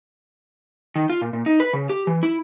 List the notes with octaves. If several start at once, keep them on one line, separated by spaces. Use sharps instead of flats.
D#3
F4
A#2
A#2
D#4
B4
C#3
G4
E3
E4